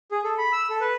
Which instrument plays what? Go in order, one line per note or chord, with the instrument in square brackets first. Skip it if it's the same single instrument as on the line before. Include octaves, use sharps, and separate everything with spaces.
[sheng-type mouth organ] G#4
A4
B5
E6
A4
B4